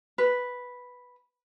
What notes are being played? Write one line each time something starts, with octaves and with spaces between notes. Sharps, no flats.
B4